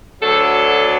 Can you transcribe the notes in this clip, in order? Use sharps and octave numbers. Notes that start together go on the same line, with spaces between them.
D2 D3 F#3 A4